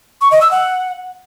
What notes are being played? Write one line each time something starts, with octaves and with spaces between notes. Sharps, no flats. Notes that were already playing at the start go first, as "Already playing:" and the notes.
C#6
D#5
E6
F#5